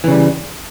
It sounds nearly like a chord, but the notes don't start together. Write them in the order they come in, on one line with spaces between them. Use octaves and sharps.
E3 C#3 G3